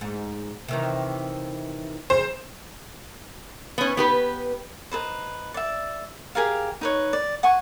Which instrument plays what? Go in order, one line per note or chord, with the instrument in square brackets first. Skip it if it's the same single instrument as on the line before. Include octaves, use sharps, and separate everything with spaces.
[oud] G#2
C3 D#3 E3
[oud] C#3 [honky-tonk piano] C5
[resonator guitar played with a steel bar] B3 C#4
B3 G4 B4
[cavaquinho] D#4 A4 B4 C5
D5 E5
G4 G#4 A#4 F5
D#4 B4 C#5
D5
F#5 G#5 C#6